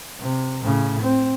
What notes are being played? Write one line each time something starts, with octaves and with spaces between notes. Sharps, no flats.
C3
A2 C#3
C4